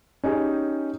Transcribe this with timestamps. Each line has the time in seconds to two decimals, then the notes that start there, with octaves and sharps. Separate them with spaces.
0.24 C#4 D#4 G4 G#4